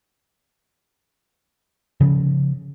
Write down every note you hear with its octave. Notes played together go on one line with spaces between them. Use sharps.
C#3 F3